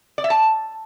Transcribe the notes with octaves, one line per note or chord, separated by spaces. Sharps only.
D5
E5
A5